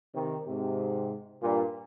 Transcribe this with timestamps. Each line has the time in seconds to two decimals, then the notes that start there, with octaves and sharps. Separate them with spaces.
0.14 C3 D#3
0.46 G#2 C3
1.41 G2 A#2